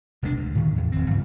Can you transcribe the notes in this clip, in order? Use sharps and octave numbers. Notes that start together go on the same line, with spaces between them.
E1 C3 G#3 D4
D2
A2 D#3
E2 E3
D1 C4
G2 C#3